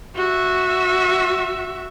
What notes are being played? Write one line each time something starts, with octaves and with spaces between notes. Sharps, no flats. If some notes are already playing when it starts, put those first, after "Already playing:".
F#4 E5